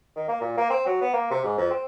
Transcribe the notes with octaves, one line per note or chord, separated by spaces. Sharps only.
D#3
A#3
A#2
A#3
C4
F#3
B3
A#3
C3
G#2
F2
C4